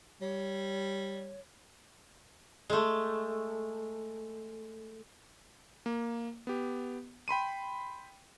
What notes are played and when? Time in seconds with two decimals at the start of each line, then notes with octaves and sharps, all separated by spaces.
0.21 G3 C#5
2.70 G#3 A3
5.86 A#3
6.47 B3 G4
7.28 G5 B5 C6 D#7